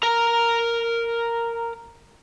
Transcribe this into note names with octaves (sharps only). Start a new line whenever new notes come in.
A#4 A#5